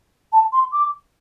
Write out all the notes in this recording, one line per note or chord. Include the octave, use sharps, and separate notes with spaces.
A5
C6
D6